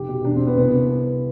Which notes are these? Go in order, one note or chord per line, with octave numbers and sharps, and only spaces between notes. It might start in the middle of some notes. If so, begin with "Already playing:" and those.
Already playing: F1 G4
B2
E1 D4
C4
D3
B3
C2 B3
C3